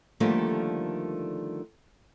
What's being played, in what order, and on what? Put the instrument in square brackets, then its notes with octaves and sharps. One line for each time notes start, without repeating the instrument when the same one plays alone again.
[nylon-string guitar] D3 D#3 F3 G3 A3 A#3